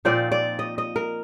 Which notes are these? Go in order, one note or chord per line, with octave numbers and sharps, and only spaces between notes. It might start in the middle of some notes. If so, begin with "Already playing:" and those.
A#2 F3 C4 D#4 D5
D5
D#5
D#5
A#4